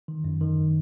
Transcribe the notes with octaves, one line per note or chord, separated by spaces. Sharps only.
D#3
F#2
D#3